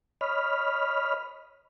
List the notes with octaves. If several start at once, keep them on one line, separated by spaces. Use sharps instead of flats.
C#5 D#5 B5 F6